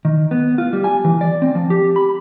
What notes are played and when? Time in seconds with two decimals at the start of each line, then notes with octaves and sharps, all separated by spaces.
0.05 D#3
0.31 B3
0.58 F4
0.73 G3
0.84 G#5
1.05 E3
1.21 D5
1.42 C4
1.55 F3
1.70 G4
1.96 B5